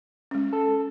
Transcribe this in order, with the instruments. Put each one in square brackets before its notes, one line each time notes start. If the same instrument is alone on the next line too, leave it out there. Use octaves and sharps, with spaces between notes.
[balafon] G#3 C#4
[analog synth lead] A4